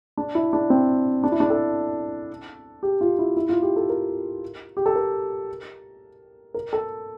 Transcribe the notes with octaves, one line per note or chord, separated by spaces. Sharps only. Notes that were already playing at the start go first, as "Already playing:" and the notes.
D4
E4
D4
C4
D4
E4
D4
A4
G4
F4
E4
E4
F4
G4
A4
A#4
G4
A4
A#4
A#4
A4